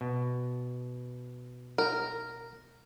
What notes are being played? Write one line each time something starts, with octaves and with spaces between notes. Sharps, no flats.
B2
A#4